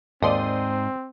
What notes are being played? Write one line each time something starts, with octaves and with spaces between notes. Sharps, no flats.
D#2 G#2 C4 D5 C6 D#6